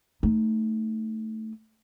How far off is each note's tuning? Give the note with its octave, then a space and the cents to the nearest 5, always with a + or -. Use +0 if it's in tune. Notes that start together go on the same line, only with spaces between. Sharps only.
A3 +0 D#4 +0